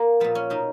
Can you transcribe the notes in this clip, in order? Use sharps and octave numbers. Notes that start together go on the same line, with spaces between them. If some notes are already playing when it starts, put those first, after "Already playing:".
Already playing: A#3
A#2 F3 B3
C#4
B2 D#4